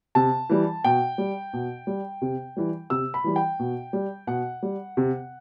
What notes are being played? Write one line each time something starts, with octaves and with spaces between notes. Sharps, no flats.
C3 A5
E3 G3
B2 G5
G3
B2
G3
C3
E3 G3
C3 E6
B5
E3 G3
G5
B2
G3
B2 F#5
G3
C3